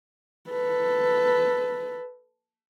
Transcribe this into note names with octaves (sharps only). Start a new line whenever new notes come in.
A4 B4